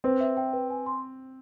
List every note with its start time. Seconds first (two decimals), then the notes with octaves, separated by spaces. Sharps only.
0.04 C4 B4
0.20 E5
0.37 G5
0.53 B4
0.70 G#5
0.86 C6